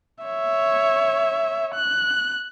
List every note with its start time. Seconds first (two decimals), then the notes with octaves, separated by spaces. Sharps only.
0.25 C#5 E5
1.75 F#6